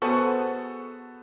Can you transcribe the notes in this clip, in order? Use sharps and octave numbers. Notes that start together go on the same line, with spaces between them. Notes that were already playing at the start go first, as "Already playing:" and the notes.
B3 F#4 G#4 A4 C5